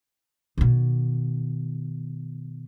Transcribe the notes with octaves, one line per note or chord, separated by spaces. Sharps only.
B2 D#3